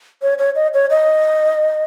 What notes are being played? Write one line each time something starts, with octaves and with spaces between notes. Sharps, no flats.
C#5
C#5
D#5
C#5
D#5